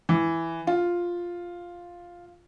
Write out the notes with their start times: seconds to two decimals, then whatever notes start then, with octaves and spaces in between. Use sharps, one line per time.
0.09 E3
0.67 F4